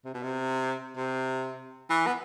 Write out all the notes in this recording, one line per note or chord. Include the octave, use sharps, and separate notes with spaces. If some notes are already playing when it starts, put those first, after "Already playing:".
C3
B2
C3
C3
E3
B3